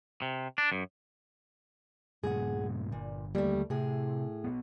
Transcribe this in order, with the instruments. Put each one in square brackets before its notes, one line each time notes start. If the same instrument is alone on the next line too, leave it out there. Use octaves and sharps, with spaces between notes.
[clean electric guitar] C3
D4
F#2
[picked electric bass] G2 A#2 C#3 [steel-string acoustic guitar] G#4 F#5
[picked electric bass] G1 [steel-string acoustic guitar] A#2
[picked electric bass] D#2 D3 A#3 [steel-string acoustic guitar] G3 A3
[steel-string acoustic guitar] A2 G#4 [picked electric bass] C3
[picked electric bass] B1 F2 B3